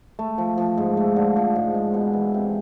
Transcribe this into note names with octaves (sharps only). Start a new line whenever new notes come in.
A3
F3
F3
G#2
A3
D3
F3
G#2
G#3
B2
E3
C3